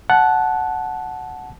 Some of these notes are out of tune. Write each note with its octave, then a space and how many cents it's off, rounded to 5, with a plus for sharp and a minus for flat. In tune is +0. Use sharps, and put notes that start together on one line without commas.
F#5 +0 A5 -15